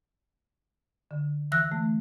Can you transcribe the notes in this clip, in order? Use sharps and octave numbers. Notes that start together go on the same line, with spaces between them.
D3
E3 E6 F#6 A#6
A3